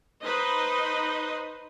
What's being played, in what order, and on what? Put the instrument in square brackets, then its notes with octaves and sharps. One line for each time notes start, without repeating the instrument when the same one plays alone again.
[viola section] D#4 B4 C5 D#5